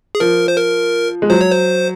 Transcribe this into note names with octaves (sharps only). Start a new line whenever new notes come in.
G#4
F3 A#4
C5
A#4
G#3
F#3 C5
C#5
C5